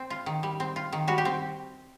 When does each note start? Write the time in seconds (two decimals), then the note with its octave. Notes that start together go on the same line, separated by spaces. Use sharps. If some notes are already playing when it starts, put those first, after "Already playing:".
Already playing: C4
0.10 F4
0.26 D#3
0.43 G3
0.60 C4
0.76 F4
0.92 D#3
1.08 G3 F#4
1.18 G4
1.25 C4